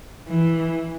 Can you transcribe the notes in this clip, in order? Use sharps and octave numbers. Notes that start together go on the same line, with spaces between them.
E3